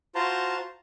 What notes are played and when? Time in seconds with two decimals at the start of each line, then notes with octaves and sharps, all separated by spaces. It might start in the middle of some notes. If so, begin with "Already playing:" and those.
0.15 F4 F#4 C5 A5 A#5 C6